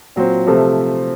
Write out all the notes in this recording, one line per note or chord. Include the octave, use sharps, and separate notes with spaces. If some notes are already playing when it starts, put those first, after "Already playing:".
A#2 F#3 C4
C3 F3 A3